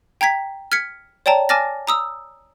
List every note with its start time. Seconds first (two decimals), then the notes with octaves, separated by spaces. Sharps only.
0.21 G5 A#5 G#6 B6
0.72 F6 G#6 B6 C#7
1.26 C#5 D5 G5 A5 A#5
1.49 G#5 A5 D6 F6 A6 A#6
1.87 A#5 D#6 E6